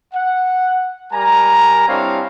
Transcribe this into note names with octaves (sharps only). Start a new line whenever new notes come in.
F#5
G3 A#4 G#5 A#5
G3 C4 D4 E4 C#5 F5